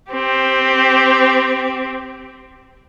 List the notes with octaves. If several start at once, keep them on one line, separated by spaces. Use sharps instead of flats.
C4 G4